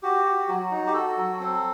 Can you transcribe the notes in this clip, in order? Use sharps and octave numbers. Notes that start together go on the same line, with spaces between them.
F#4 G4
F#4
F#3 F#4
D#4
G4
F#4 A4
F#3
C4